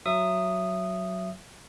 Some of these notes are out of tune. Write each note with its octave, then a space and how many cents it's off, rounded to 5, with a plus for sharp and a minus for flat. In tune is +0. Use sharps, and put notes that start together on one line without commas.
F#3 +0 E5 +20 D#6 -10